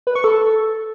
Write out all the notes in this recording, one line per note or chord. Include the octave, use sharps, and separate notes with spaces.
B4
C#6
A4